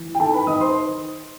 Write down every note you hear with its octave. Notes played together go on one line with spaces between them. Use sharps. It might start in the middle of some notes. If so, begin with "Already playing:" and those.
Already playing: E3
G5
D#3 A4 A5
B4 B5
D#3 D#5 D#6
C5 C6